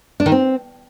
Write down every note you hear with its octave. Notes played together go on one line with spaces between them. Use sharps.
D4
D#3
C4